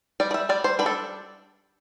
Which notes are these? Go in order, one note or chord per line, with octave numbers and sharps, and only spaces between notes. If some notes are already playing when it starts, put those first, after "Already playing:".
G3 D5
D5
E5
G3 D5
C5
D4 B4
A4